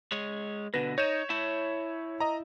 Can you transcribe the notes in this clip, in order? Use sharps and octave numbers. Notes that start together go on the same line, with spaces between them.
G#3 C#5
B2 D3 B4 A#6
D#4 C#5 G6 E7
E4 A5
D#5 A#5